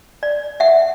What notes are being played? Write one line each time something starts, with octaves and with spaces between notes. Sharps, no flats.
D5
E5 F#5